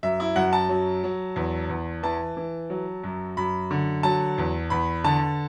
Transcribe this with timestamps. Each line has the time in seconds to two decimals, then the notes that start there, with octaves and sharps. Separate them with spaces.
0.03 F#2 E5
0.20 E4
0.36 F#2 F#5
0.53 A5
0.69 F#3
1.04 F#3
1.36 E2
1.69 E2
2.03 E3 A5
2.37 E3
2.70 F#3
3.04 F#2
3.37 F#2 B5
3.71 D3
4.03 F#3 A5
4.38 E2
4.70 E2 B5
5.04 D3 A5